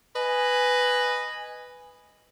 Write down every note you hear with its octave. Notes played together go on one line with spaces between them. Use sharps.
B4 D#5 G#5